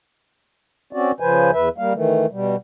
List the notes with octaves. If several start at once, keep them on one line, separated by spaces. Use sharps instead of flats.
C4 C#4 F#4 D5
C#3 F3 B4 C5 G#5
E2 B4 E5
G3 A#3 F5
D#3 E3 A3
B2 G3